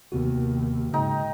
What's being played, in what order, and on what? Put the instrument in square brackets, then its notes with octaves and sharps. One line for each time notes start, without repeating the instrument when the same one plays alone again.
[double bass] D#2 D#3 [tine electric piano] C3 B3 F#4
[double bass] G#2 [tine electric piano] C#3 [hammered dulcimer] D#4 G5